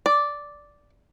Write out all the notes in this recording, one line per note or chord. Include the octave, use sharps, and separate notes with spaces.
D5